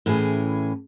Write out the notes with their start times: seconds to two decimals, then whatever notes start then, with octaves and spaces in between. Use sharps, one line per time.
0.06 A2 E3 C#4 G#4